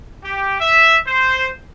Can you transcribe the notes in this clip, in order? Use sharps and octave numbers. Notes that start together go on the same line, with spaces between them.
G4
E5
C5